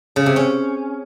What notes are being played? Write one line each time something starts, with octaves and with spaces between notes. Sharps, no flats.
C#3
C3
C#4